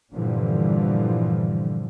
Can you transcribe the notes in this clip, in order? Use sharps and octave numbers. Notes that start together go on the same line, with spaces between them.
G2 A#2 D3 E3 F3 G3